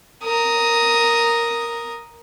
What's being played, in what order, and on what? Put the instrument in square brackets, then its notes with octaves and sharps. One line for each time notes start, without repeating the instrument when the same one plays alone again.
[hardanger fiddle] A#4 D#6